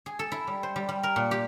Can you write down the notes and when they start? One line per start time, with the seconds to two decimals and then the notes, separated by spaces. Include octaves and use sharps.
0.06 G#4
0.19 A4
0.32 E4
0.47 G3
0.63 C5
0.76 G3
0.89 G3
1.03 A#4
1.16 A#2
1.31 G4